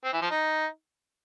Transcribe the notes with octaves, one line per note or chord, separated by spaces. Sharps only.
C4
E3
F3
D#4